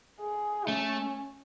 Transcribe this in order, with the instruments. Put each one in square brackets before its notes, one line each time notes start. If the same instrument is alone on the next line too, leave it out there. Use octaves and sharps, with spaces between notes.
[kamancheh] G#4
[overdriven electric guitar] A3 [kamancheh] C#4